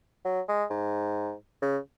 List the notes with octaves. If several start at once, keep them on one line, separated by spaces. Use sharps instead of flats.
F#3
G#3
G#2
C#3